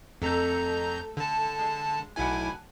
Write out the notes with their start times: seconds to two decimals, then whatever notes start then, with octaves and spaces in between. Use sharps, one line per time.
0.22 F2 A3 A4 A#5 G6
1.17 D3 A5
1.59 G#3
2.16 B1 A2 E4 F#4 F#5 G#5